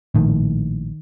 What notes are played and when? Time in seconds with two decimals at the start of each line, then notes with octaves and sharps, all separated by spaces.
0.15 A#1 A2 D#3